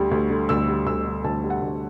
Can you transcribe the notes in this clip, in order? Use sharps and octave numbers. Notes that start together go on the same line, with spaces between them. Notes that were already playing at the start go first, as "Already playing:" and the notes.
Already playing: D2 G3
D2
D3
D2 E6
G3
D2 E6
D3
D2 A5
G3
F#5
D2